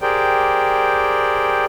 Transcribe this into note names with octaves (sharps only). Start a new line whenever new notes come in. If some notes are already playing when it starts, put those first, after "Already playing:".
G4 G#4 A#4 C5 D5 G5